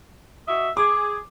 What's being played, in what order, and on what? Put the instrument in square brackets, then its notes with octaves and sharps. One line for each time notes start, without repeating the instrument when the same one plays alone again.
[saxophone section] F#4 D#5 E5
[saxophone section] G#4 [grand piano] D6